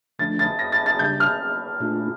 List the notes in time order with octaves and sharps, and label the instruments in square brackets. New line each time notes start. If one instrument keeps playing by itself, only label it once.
[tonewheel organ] D3 F3 A3 D4 [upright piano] A6
[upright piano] A6
A#6
A6
A6
[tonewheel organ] C#3 G3 D4 G4 [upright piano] G6
[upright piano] F6
[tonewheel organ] A#2 A3 D4 F4